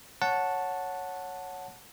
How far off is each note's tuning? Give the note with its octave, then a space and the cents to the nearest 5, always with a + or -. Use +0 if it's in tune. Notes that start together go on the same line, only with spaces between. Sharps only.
C#5 +0 F#5 -10 A5 +0